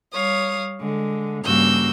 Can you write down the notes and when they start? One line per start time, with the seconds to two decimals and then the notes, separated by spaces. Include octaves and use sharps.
0.13 G3 C#5 F5 D#6
0.80 D3 G#3
1.44 G2 C#3 A#3 F#4 E6 G6